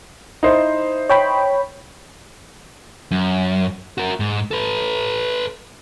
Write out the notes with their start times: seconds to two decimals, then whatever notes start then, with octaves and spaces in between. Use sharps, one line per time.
0.43 D#4 E4 C5
1.09 C#5 G5 B5
3.11 F#2
3.98 F#4 A#4
4.20 G#2
4.51 A4 B4